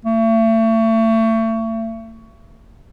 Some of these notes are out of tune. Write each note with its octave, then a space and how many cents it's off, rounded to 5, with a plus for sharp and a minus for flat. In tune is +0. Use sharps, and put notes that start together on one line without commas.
A3 +35